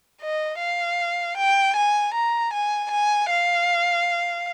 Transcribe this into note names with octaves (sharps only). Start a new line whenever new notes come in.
D#5
F5
G5
G#5
A#5
G#5
G#5
F5